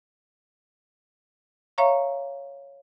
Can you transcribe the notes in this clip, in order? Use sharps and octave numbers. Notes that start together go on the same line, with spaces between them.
C#5 E5 F5 A#5 C#6